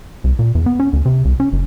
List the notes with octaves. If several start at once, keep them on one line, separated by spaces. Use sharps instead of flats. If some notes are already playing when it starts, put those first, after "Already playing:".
C2
A#2
E2
B3
C#4
D2
C3
C2
C#4
F#1